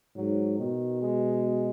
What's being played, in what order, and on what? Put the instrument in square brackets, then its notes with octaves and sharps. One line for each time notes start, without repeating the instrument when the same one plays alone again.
[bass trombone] G#2 [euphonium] F#3
[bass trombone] B2 [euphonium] D#3
[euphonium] G#3